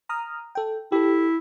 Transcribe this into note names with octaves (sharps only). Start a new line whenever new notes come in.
A#5 D#6 F6
A4 G5
E4 G4 A4